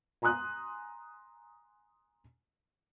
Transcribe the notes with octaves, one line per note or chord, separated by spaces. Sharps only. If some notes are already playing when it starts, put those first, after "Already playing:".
G#5 A#5 C6 D#6 F#6